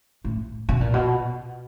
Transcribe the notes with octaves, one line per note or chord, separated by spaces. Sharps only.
A2
B2
A#2
B2